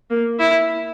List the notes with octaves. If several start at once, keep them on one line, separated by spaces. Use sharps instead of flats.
A#3
E4